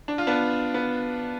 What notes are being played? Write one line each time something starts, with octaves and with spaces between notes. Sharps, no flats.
D4
F4
B3 D4
B3